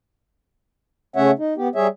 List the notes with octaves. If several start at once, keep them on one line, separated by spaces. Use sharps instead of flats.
C#3 A3 C#4 C#5 E5 F#5
D#4
B3 G4
G3 G#4 C#5 E5